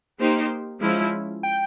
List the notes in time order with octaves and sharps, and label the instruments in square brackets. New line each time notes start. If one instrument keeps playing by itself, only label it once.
[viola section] A#3 D#4 G4 C5
F3 G#3 C#4 E4
[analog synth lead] G5